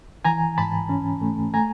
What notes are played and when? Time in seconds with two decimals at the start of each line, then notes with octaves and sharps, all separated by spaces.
0.25 E3 G#5 A#5
0.58 G#2 A5 B5
0.89 C#4
1.21 A3
1.54 A3 G#5 A#5